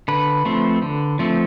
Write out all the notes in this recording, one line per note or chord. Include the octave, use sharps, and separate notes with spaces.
D3 B4
F3 A3 C4
D3
F3 A3 C4